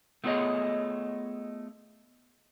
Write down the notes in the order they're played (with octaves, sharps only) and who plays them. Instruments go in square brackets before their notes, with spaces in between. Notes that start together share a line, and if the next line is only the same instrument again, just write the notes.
[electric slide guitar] A3 B3 F4 G#4 C#5 D#5